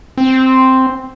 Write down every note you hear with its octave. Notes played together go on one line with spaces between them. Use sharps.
C4